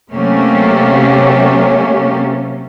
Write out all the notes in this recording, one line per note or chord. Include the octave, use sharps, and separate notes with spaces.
C3 F#3 A3 A#3 C#4 G4